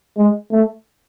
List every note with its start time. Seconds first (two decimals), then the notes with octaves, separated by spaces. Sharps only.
0.17 G#3
0.51 A3